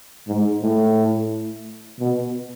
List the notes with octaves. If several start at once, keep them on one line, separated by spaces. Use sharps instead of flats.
G#2
A2
B2